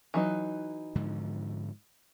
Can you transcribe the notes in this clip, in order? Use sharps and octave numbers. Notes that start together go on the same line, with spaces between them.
E3 F#3 D#4
G#2 D3 F3